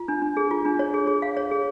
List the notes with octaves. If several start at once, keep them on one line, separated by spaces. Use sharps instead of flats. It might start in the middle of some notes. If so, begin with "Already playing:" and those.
Already playing: F4
D4
D4
G#4
F4
D4
C#5
G#4
G#4
F5
C#5
G#4